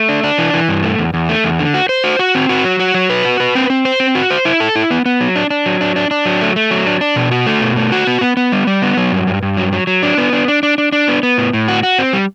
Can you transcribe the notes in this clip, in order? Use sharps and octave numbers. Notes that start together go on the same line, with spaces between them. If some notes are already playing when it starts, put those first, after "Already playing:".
Already playing: A3
D4
D4
E3
E3
G2
A3
E2
E2
A3
E2
D3
F#4
C5
F#4
F#4
C4
F#4
F#3
F#4
F#3
B4
F#4
B4
C4
C4
C5
C4
F#4
C5
E4
A4
E4
B3
B3
F#3
D4
D4
F#3
D4
D4
D4
F#3
A3
A3
F#3
D4
D4
B2
F#4
A3
B2
A3
F#4
B3
B3
B3
G3
G3
B3
F#3
G2
G2
G2
F#3
F#3
F#3
D4
B3
D4
D4
D4
D4
D4
B3
B3
A2
A2
F#4
F#4
C4
G3